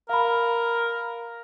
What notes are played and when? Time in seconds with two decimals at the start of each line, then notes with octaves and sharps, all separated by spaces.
0.09 A#4 F5 B5